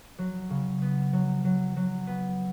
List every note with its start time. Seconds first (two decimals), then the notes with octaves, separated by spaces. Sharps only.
0.19 F#3
0.50 C#3
0.82 B3
1.13 F#3
1.45 F#3
1.76 F#3
2.07 B3